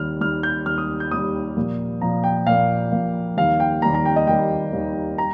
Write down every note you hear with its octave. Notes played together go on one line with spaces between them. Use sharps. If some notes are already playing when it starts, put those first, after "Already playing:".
Already playing: D#2 D#3 G3 F6
D#2 D#3 G3 F6
G6
D#2 D#3 G3 F6
D#6
G6
D#2 D#3 G3 D#6
A#2 F3 A#3
A#2 F3 A#3 A#5
G5
A#2 F3 A#3 F5
A#2 F3 A#3
D#2 D#3 G3 A#3 F5
G5
D#2 D#3 G3 A#3 A#5
A#5
G5
D#5
D#2 D#3 G3 A#3 G5
D#2 D#3 G3 A#3
G3 A#5